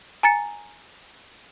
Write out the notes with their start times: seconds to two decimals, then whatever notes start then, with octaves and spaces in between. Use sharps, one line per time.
0.23 G#5 A#5 A6 C#7